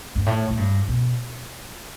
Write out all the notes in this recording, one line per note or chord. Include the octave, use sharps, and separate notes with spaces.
G2
A2
A2
G2
B2